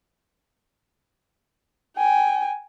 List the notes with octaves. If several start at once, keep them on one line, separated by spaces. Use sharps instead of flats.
G5 G#5